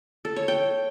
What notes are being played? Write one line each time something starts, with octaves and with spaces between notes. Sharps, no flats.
A4
C#5
G5